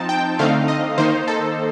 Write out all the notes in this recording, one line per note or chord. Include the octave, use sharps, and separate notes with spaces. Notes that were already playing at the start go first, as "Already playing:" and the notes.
Already playing: F3 C4 D#4 A5
G5
D3 A3 C4 D#4 F5
D#5
D#3 A#3 D#4 C5
A4